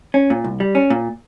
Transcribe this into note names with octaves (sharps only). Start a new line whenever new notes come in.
C#4
A#2
C2
G3
C#4
A#2